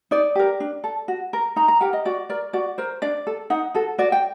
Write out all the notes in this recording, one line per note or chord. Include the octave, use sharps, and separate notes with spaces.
D#4 D5
G4 A#4
D4
A4
F#4
A#4
D#4 A#5
A#5
G4 A#4 F#5
D#5
F#4 D5
A#4 D5
F#4 D5
A#4 C5
D4 D5
A4
D#4 F#5
F#4 A4
F#4 D5
G5